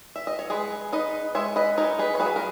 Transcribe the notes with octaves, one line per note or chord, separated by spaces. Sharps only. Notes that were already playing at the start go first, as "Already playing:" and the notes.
E5
D#5
C#5
G#3 G#4 B4
D#4 B4 D#5
G#3 C#5 E5
B4 D#5
D#4 A#4 C#5
G#4 B4
C#5
F#3 G#4 B4
A#4